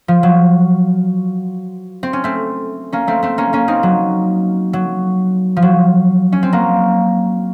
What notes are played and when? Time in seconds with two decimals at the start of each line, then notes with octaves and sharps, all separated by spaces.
0.08 F3
0.23 F#3
2.03 C4
2.13 C#4
2.24 A3 C4
2.93 A#3 C#4
3.07 A3 C4
3.23 A3 C4
3.38 A#3 C#4
3.53 A#3 C#4
3.68 C4 D#4
3.83 F#3
4.73 F#3
5.57 F3
5.62 F#3
6.32 C#4
6.43 C4
6.52 F#3 A#3